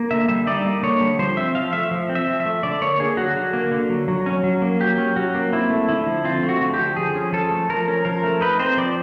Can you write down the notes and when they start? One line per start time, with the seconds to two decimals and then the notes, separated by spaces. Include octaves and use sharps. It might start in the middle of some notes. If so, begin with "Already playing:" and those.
Already playing: A#3
0.11 D3 E5
0.28 G3 E5
0.47 D#4 D5
0.65 A#3
0.83 D3 C#5
1.01 G3
1.19 F3 C5
1.37 C4 E5
1.55 F3 F5
1.73 A3 E5
1.91 F3
2.09 C4
2.15 E5
2.28 F3
2.40 E5
2.46 A3
2.63 D3 D5
2.81 A#3 C#5
3.00 D3 G#4
3.17 F#3 F#4
3.36 D3
3.53 A#3
3.72 D3
3.90 F#3
4.08 F#3
4.26 C#4
4.44 F#3
4.62 A#3
4.80 F#3 G4
4.98 C#4
5.16 F#3 F#4
5.35 A#3
5.52 C4 E4
5.70 A3
5.89 D3 E4
6.07 F3
6.24 C4 F4
6.43 A3
6.49 F#4
6.62 D3
6.74 G4
6.79 F3
6.96 F3 G#4
7.15 C#4
7.33 F3 A4
7.51 A3
7.69 F3 A#4
7.88 C#4
8.05 F3 A#4
8.23 A3
8.41 D#4 B4
8.59 C4 C5
8.77 F3 D5